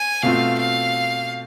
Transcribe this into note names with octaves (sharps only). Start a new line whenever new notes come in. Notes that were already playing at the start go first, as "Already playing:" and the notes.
Already playing: G#5
B2 A3 C4 F4 F5
F5